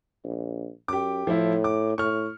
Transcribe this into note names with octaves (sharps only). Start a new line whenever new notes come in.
A#1
F#2 G4 D6
A2 F3 E4
D6
A2 C#6 F6